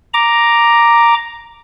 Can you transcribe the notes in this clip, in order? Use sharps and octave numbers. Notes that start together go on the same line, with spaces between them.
A#5 D6